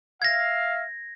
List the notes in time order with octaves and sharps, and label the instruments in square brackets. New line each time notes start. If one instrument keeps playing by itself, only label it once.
[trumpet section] E5 F5 [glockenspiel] G#6 A#6